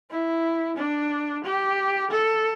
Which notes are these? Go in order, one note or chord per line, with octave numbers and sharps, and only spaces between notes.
E4
D4
G4
A4